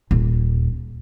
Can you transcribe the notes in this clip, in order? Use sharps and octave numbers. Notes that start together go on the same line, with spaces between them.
D#1